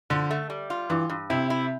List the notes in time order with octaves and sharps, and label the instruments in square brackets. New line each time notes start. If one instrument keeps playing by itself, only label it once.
[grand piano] D3 [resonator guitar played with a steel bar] F3
[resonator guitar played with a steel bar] A3
G3
F4
[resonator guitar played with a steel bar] G2 [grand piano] E3
[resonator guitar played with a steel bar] G2
[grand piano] C3 [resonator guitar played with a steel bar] E4
[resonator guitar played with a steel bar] E4